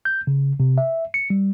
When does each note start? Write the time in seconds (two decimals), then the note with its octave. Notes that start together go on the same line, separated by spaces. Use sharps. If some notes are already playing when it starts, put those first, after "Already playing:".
0.05 G6
0.27 C#3
0.60 C3
0.78 E5
1.14 C#7
1.30 G3